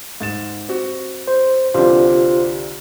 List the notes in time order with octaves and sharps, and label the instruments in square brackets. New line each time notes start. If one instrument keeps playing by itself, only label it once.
[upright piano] G#2 A6 E7
C4 F#4
[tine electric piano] C5
[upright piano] C2 D3 [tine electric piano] F4 G4 C5